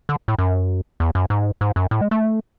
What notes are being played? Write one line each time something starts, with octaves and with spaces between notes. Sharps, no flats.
D3
A2
F#2
E2
F#2
G#2
G#2
F#2
A2
G#3
A3